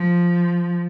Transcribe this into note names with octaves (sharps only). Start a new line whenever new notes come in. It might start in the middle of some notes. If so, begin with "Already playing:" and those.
Already playing: F3